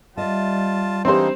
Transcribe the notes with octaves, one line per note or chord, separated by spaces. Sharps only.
G3 F4 D#5 E5 A5
E3 G#3 A#3 C4 D4 D#4 G4 C5